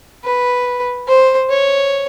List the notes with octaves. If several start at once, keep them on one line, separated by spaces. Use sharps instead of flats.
B4
C5
C#5